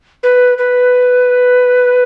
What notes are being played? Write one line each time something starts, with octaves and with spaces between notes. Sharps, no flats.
B4
B4